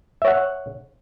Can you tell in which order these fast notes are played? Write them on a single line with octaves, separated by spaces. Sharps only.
E5 C#5 F#5